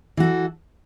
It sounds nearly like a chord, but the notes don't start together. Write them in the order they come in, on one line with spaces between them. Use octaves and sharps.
E3 F#4 A4